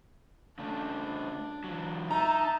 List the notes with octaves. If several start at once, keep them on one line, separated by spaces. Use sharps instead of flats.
C#3 A3 D4
E3 F#3
D#4 E5 A5 A#5